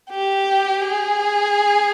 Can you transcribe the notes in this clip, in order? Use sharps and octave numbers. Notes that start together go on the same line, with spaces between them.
G4
G#4